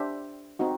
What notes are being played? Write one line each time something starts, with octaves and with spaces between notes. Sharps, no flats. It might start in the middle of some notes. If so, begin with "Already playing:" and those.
Already playing: D4 G4 C5 E5
C4 D#4 F#4